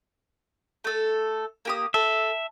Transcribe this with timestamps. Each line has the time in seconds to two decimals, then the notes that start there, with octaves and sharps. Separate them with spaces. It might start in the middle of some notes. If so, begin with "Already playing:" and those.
0.84 A3 A4
1.65 A#3 G4 D#6
1.94 A4 E5